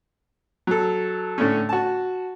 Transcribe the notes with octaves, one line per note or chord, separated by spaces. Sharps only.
F#3 A4
A2 D3 A3 C#4
F#4 A5